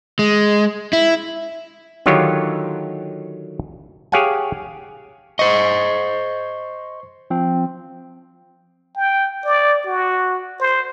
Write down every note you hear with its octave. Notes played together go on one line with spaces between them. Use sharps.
G#3
E4
D3 D#3 F#3 F4 G4 C#5
G4 G#4 C#5 F5 F#5 G#5
C5 D#5 C#6 C#7
F3 C4
G5
D5
F#4
C5